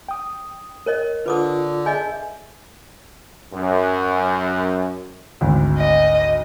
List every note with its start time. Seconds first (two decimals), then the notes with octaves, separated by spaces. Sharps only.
0.09 G5 D#6
0.86 A#4 C#5 D#5
1.26 D3 F4 B4 D6 D#6
1.86 G#4 D#5 E5 G#5 G6
3.52 F#2
5.41 G#1 D2
5.78 D#5